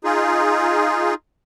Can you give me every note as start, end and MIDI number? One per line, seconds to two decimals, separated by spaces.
0.04 1.14 63
0.04 1.14 65
0.04 1.14 68